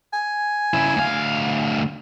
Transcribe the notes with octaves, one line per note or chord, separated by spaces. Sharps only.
G#5
C#3 E4
D2 F5